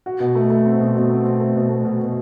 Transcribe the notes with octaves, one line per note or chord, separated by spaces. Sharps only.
F#4
B2
A3
A3
C4
B2
B2
C4
C4
A3
B2
A3
B2
B2